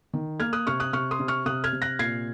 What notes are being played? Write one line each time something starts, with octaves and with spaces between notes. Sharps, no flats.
D#3
A#3 F6 G#6
D#6 F#6
C3 C#6 F6
D#6 F#6
C3 C#6 F6
C6 D#6
C3
C#6 F6
C3 D#6 F#6
F6 G#6
C3
F#6 A#6
A#2 G#6 C7